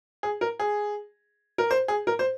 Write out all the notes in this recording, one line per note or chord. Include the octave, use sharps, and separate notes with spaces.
G#4
A#4
G#4
A#4
C5
G#4
A#4
C5